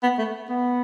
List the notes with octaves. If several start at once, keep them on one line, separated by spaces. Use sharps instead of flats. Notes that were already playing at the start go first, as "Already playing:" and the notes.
B3
A3
B3